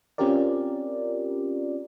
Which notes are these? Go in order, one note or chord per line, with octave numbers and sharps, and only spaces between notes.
C4 C#4 F4 G4 A#4 D5